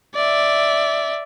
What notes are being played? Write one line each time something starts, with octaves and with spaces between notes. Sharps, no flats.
D5 E5